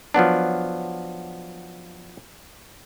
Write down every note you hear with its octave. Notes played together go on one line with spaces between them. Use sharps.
F3 F#3 B3 D4